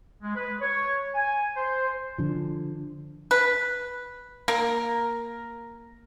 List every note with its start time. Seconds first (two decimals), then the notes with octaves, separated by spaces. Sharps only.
0.22 G#3
0.36 B4
0.61 C#5
1.15 G#5
1.56 C5
2.18 D3 F3
3.31 B4
4.48 A#3 A#4